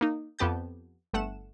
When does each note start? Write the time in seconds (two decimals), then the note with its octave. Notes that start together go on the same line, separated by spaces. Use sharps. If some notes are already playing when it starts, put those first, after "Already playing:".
0.01 A#3 D#4
0.39 F2 B3 G4 A5 G6
1.13 G1 A3 F#5 E7